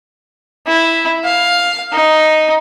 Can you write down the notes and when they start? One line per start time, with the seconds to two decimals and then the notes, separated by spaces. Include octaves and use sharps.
0.67 E4
1.25 F5
1.93 D#4